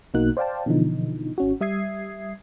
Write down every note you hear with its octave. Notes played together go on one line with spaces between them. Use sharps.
B1 B2 A#3 D#4 F#4 F#6
C5 D5 F5 G5 A5
B2 D3 E3 F3 D#4
G#1 C#4 F#4
G3 E5 D#6 G#6 C7